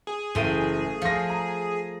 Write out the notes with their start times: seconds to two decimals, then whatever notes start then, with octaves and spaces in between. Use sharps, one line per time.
0.07 G#4
0.35 F#1 E3 A3 F5 G5 D#7
1.02 F3 F5 A#6
1.30 A#5